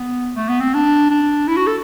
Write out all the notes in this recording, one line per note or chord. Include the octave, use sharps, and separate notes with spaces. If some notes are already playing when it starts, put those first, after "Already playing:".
Already playing: B3
A3
B3
C4
D4
D4
E4
F#4
A4